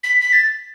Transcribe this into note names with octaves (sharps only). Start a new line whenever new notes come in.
B6
B6
A6